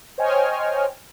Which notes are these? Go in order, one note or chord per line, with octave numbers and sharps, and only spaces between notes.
C5 C#5 D#5 G5 G#5 F6